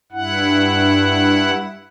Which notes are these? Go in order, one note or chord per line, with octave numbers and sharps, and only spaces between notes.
G2 E4 F#5